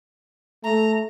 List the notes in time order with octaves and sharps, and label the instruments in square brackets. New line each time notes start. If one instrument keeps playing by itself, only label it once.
[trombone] A3 [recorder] A#5